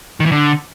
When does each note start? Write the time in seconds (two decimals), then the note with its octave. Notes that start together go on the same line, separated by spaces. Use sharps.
0.20 D#3
0.26 E3
0.32 D3